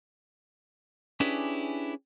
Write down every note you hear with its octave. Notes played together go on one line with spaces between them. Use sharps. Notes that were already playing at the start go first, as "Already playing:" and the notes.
C#4 D4 E4 G4 G#4 B4